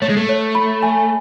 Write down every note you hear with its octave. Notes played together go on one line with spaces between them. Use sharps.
A3 C#5
G#3
A3
C#5
B5
G#5